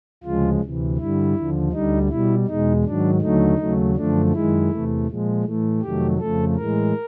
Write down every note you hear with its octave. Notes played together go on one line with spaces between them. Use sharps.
D2 C#3 F3 G#3 F4
D2 C3 E3
G2 D3 G3 E4
D#2 D3 F3
D2 D3 G3 D#4
B2 G3 E4
E2 B2 G#3 D#4
G#2 D#3 F#3 D4
D#2 D3 F#3 A3 D#4
D#2 C#3 F#3 A3
F#2 D3 F3 A3 D4
F#2 D#3 G#3 E4
E2 C3 E3 A3
A#2 F3 G#3
A2 E3 A3
F2 C3 D#3 F#3 A3 G4
F2 C#3 F3 A3 A4
A2 E3 G#3 A#4